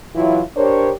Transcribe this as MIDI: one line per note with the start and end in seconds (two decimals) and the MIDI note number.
0.16 0.41 52
0.16 0.41 54
0.16 0.41 64
0.16 0.41 65
0.57 0.91 62
0.57 0.91 67
0.57 0.91 70
0.57 0.91 72
0.57 0.91 73